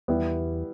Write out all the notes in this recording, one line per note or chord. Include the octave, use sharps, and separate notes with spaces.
E2 G3 B3 E4 G4